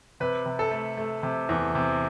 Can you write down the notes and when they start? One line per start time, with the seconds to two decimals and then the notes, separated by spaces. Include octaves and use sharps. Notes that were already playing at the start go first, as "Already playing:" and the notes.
0.20 C3 B4
0.46 C3
0.59 A4
0.71 A3
0.98 A3
1.23 C3
1.49 E2
1.75 C3